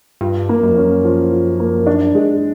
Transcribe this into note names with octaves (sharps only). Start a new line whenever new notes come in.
G2 F4
A#3
F#2
F2
F#2 C#4
F3
F4
A#3
D4
G#3